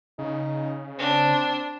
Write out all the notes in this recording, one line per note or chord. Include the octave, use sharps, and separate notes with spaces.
C#3 D#4
C4 D4